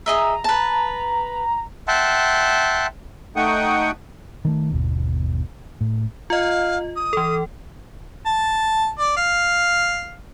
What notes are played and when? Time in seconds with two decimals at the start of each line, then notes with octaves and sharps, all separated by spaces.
0.06 G#4 D#5 E5 A#5
0.44 B4 A5
1.88 E5 F#5 G5 A5 C6
3.36 A3 D#4 F#5 G5 C#6 D#6
4.45 D#3 F#3 A3
4.71 G1 D#2 B2
5.81 A2
6.30 F4 D#5 F5
6.95 D#6
7.13 E3 A4
8.26 A5
8.99 D5
9.17 F5